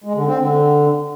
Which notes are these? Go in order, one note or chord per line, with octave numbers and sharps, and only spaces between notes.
G#3
D3
C4
D3